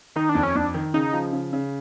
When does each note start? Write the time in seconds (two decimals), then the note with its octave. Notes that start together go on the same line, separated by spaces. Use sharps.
0.16 D#3 D#4
0.29 D4
0.35 F2
0.43 C#4
0.55 F2 D4
0.74 D#3
0.94 C#3 D#4
1.13 F3
1.33 C#3
1.53 C#3